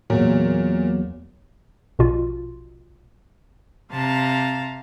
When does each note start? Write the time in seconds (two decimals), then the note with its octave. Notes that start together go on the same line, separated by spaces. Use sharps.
0.10 E2 A#2 F#3
1.99 A#1 B2 F4
3.91 C3 F5 A5 A#5